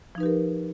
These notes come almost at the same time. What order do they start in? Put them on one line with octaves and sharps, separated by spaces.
F3 D#4 B4 G4 A#4